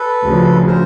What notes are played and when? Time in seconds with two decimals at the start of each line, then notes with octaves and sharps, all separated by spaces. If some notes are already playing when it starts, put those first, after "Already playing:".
Already playing: A4 B4
0.22 D2 C#3 F3
0.67 A#4 C5